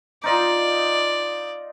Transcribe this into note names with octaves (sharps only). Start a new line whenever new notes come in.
D#4 F4 D5 D#5